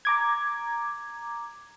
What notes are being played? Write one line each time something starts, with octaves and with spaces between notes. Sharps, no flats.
A#5 D6 G#6